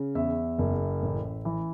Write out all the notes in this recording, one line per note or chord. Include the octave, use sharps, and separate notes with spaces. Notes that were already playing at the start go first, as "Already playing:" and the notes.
Already playing: C#3
E2 E5
F#1
A1
E3